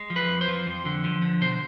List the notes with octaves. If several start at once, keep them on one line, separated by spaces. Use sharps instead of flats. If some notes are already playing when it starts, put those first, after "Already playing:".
Already playing: G#3
F3
B4
F2
C5
F3
F2
D3
F3
D3
B2 C5